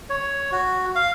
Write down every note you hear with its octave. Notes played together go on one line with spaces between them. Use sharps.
C#5
F#4
F5